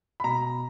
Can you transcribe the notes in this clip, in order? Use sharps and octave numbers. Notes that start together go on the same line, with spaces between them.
B5
B2 A#5